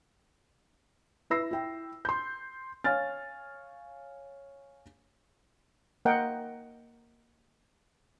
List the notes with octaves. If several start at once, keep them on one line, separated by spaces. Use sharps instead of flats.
E4 B4 E6 A#6 C7
E4 G5
C6 G6
C#5 F5 G#5 F6 A6
A#3 A#4 D#5 F#5 G5